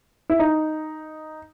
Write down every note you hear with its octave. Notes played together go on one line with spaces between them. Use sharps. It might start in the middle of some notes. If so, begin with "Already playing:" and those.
E4
D#4